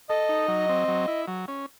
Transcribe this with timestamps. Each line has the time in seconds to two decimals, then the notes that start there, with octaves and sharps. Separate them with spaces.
0.10 A4 D#5
0.29 D#4
0.48 F#3
0.69 C4
0.88 F#3
1.08 E4
1.28 F#3
1.48 C#4